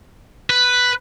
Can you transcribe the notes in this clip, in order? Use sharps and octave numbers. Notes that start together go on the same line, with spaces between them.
B4